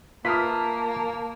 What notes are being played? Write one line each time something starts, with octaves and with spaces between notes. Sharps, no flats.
A#3 F4 B4 E5 A5 D#6 F6 B6